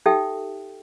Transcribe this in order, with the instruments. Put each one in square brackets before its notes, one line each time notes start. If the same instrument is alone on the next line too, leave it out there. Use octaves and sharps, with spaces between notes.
[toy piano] D#4 G4 A4 E5 G5